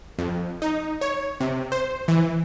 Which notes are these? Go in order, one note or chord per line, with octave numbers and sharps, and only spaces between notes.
F2
D#4
C#5
C3
C5
E3